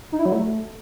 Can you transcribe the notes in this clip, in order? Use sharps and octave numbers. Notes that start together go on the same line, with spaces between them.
D#4
E4
F#3
A3